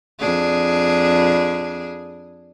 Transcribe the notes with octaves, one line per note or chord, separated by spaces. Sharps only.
F2 D4 G#4